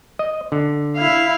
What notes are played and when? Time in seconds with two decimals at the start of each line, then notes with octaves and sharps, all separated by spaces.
0.19 D#5
0.52 D3
0.97 E4 F5